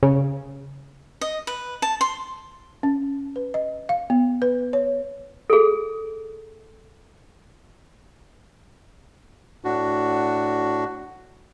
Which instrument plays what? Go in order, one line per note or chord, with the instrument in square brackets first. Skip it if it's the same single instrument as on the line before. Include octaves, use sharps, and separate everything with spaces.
[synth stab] C#3
[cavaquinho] D#5
B4
A5
C6
[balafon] C#4
B4
D#5
F5
B3
B4
C#5
[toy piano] G#4 A4
[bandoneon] A2 D4 F#4